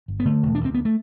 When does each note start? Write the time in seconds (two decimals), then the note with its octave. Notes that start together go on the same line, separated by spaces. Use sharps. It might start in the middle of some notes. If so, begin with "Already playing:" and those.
0.08 G1
0.20 B3
0.25 D3 A3
0.43 E1
0.55 D4
0.61 D2 C4
0.74 B3
0.85 A3